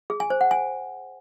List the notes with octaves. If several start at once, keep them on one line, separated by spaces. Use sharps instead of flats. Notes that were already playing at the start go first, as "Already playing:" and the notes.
G#4
G#5
C5
F#5
G#5